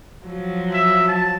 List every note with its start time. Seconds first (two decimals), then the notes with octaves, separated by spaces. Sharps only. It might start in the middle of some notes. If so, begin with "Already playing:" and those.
0.24 F3 F#3
0.73 E5
1.08 A5